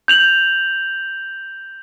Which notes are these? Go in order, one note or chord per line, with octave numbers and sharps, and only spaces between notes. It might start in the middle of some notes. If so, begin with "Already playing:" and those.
G6 F7 F#7